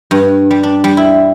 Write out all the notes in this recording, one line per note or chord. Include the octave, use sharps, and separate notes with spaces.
G2
G3
D4
G3
E4